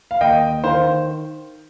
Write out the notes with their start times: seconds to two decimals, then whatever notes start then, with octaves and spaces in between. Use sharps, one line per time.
0.11 F5
0.21 D#2 D#5 G5
0.64 D#3 C5 F5